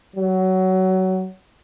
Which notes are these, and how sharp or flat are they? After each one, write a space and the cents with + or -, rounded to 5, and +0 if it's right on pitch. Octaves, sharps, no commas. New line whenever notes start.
F#3 +20